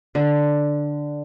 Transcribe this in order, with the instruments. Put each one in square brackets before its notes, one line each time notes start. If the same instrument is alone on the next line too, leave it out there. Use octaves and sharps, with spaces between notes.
[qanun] D3